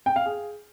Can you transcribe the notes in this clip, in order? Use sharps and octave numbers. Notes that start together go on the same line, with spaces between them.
G5
F5
G#4